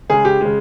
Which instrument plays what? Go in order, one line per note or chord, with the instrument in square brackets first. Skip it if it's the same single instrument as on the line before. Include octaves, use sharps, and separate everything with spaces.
[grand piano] C#3 G#3 G#4
G4
C#3 G#3